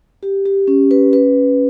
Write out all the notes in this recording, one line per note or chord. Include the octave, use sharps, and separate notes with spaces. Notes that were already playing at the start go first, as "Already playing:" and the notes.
G4
G4
C#4
B4
B4